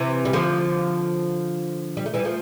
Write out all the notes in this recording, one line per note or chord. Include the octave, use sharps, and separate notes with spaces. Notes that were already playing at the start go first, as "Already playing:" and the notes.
Already playing: C3 E3
G3
D3 F3
G3
A3
E3 G3
F3 A3